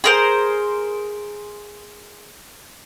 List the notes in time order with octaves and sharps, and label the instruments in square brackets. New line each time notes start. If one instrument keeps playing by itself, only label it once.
[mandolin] G#4 A#4 C5